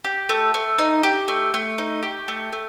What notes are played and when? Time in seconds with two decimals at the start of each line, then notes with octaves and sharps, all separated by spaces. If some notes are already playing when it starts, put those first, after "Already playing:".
0.04 G4
0.29 A3
0.54 A3
0.78 D#4
1.03 G4
1.28 A3
1.54 A3
1.78 D#4
2.03 G4
2.28 A3
2.53 A3